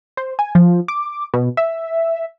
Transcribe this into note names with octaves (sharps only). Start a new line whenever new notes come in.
C5
G#5
F3
D6
B2
E5